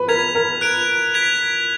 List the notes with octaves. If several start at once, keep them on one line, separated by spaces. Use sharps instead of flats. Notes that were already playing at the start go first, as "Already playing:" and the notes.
Already playing: B4
A#4 G#6 B6 F7
A#4
F#6 D7 F7
G#6 B6 F7